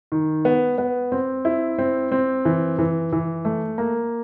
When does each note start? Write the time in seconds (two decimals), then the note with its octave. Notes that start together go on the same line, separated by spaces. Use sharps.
0.12 D#3
0.45 B3
0.78 B3
1.12 C4
1.45 E4
1.78 C4
2.12 C4
2.45 E3
2.79 E3
3.12 E3
3.45 A3
3.78 A#3